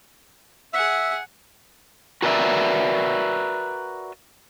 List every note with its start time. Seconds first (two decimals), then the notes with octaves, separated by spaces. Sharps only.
0.73 G#4 E5 F#5
2.22 F#4 A#4 B4 D5 E5